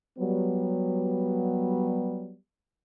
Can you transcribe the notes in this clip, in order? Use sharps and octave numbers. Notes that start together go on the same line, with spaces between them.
F#3 G3 B3